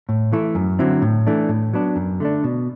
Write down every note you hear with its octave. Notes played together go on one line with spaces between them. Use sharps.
A2
E3 A3 E4
F#2
D3 F#3 C4 E4
A2
E3 A3 D4
A2
F#3 B3 D4
F#2
D3 A3 D4
B2